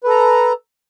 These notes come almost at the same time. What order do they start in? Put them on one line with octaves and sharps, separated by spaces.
B4 A4 A#5